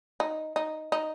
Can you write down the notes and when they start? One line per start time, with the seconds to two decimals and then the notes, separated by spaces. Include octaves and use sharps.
0.20 D#4
0.56 D#4
0.92 D#4